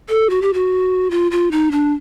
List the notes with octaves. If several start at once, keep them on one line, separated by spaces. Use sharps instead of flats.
A4
F#4
G4
F#4
F4
F4
D#4
D4